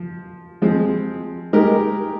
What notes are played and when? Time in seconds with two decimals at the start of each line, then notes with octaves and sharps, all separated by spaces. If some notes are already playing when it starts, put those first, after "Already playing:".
Already playing: F3
0.62 F3 G#3 C4
1.53 G#3 D#4 G4 A#4